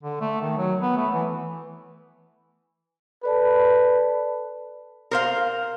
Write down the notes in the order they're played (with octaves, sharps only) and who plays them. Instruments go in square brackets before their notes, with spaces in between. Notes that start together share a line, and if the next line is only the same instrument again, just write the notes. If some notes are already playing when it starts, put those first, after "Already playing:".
[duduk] D3
A3
D#3
F#3
B3
A3
E3
[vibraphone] A4 D5 A5 [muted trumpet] B4
[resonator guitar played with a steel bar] A#4 C5 F5